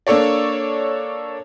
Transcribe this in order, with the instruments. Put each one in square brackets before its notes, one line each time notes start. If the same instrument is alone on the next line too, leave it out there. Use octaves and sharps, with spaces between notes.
[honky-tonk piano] A#3 D4 A4 C#5 D5